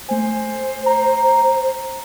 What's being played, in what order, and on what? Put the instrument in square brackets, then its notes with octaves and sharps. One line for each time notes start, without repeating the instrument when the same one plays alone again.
[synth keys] A3 G#5 [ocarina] C5
[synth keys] A#5